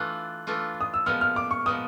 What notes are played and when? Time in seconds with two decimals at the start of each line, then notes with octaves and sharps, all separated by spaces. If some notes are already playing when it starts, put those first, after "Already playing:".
Already playing: E3 A3 D4 F4 F#6
0.47 E3 A3 D4 F4
0.81 D#6
0.94 E6
1.06 A#2 F3 G#3 B3 F6
1.21 F6
1.36 D6
1.51 C#6
1.66 A#2 F3 G#3 B3 D#6